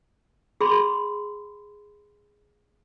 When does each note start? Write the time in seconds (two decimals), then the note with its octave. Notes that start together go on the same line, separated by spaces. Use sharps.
0.61 G#4 B5 C6